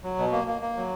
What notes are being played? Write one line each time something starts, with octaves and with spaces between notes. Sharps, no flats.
F#3
B2
A#3
A#3
A#3
F#3